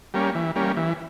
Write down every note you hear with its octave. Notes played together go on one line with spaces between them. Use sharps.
G3 A#3 C#4
E3
G3 A#3 C#4
E3